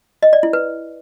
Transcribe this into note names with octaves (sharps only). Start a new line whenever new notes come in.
D#5
D5
E4
B4